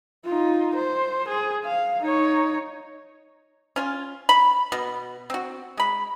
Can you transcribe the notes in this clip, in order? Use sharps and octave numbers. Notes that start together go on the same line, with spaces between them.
D#4 F4
C5
G#4
F5
D#4 C#5
C#4 F4 G#5
B5
B2
C4 F#4
G#3 B5